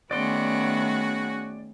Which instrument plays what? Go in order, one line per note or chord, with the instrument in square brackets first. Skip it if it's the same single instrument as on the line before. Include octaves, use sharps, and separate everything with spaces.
[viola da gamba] D#3 A3 B3 [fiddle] C#4 G#4 [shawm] F#4 [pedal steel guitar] D5 C6